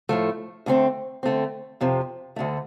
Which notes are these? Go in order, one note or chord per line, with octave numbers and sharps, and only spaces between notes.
A2 F3 A3
D2 D3 A3 C4
D3 A3 C4
F2 C3 F3
D2 D3 A3